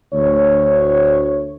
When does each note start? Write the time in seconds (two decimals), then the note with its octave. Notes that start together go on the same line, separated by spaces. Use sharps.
0.14 D2 C#5